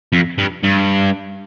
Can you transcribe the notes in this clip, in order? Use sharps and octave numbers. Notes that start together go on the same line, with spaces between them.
F2
G2
G2